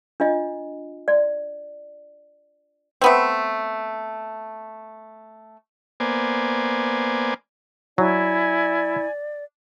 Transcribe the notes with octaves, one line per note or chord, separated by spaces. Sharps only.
D4 F4 D#5
D5
A3 B3 C4
A#3 B3 C5 D5 G#5
F#3 E4 D5 G#5